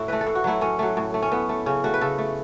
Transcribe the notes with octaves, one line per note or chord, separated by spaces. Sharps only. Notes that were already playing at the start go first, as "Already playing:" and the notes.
Already playing: A2 E4 F#4
E3 A3 B4
A4
A2
F#4
F#3 A3 E4
A2 C#4
F#3 A3
A2
A3
C#4
A2 B3
A3
C#3 C#4
A3 F#4
B4
C#3 A4
A3